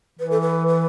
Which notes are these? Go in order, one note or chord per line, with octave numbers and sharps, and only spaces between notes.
E3 B4
A4
B4
B4